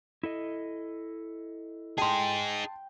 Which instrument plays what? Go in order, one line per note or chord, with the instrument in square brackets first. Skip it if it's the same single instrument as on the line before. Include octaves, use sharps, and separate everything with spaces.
[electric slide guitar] E4 A4 D#5
[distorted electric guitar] D#4 G#4 [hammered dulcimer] G5 [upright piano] A5 C6